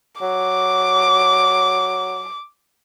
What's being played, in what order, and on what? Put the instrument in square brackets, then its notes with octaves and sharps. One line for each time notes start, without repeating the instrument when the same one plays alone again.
[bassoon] F#3 [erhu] D6